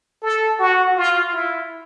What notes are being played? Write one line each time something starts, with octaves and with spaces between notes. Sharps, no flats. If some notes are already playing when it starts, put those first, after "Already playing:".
A4
F#4
F4
E4